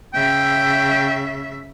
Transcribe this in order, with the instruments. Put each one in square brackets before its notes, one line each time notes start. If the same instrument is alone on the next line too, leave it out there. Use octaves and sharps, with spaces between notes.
[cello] C#3 E5 [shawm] G5